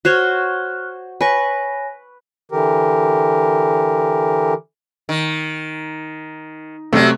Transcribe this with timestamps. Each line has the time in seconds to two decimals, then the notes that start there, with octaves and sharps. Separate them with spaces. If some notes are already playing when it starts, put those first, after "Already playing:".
0.05 F#4 C5 C#5 F6 F#6
1.21 B4 C#5 G#5 C#6 A#6
2.52 D3 E3 G4 A#4
5.09 D#3
6.93 C3 F#3 G3 A3